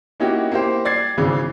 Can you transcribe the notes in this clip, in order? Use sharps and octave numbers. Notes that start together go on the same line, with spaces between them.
A#3 C#4 D#4 E4 F#4 G4
A#3 E4 G4 C5
D5 G#6 A6 C7
G#1 C#3 E3